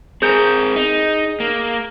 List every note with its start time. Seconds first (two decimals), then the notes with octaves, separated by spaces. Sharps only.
0.22 C4 G#4 A#4 G6
0.76 D#4
1.40 A#3